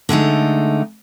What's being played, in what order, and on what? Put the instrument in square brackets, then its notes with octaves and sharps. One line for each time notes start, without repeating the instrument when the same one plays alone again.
[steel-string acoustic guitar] D3 G#3 A3 D#4